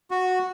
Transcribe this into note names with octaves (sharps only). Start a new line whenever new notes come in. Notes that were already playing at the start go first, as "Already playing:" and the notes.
F#4